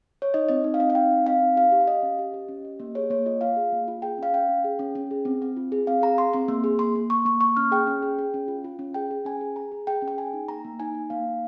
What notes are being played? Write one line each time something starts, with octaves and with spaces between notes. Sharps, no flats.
C#5
D#4 D#5
C4 D#5
D#4
F5
C4 D#5
F5
D#4 G5
C4
C4 F5
D#4
G4 F5
G4
F5
G4 D#5
C#4
G4
G4
C#4
G4
A#3 D#5
G#4 C#5
A#3 C#5
F4 D#5
F4 F5
G#4
A#3
F4
G#4 G5
C#4 F5
C#4 G5
C#4
G#4
C#4
C#4
G#4
C4
C4
F4
G#4
C4 F5
G#4 A#5
G#4 C6
C4 C6
A#3
G#4
A#3 C6
A#3
A#3 C#6
A#3 C#6
A#3 C#6
C#4 F6
G#4 G5
C#4
G#4
G#4
C#4
F4
F4
C#4
G#4 G5
G#4
C#4 G#5
G#4
G#4 A#5
G#4
G#4 G5
C#4
G5
G#4 G#5
D#4
A#3 A#5
A#3
D#4 G#5
D#4
A#3 F5
D#4